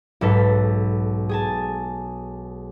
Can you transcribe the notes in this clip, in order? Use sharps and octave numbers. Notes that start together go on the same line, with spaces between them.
B1 G#2 A4 B4
G#4 G#5 A5